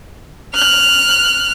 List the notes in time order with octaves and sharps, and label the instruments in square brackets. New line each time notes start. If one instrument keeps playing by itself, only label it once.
[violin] F6 F#6